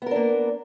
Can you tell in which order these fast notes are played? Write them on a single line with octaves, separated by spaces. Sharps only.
B3 A#4 D4 A#3